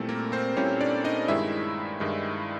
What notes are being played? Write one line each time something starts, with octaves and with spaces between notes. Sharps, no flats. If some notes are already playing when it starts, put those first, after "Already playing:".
Already playing: A#2 G3 A3 C4 E4 A4
A#3 A#4
C4 C5
A#2 G3 C4 C#4 E4 C#5
D4 D5
D#4 D#5
G2 D#3 G#3 E4 E5
G2 D#3 G#3